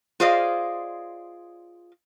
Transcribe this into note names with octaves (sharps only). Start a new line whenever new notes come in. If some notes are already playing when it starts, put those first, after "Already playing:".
F4 G#4 C5 D5 D#5 F5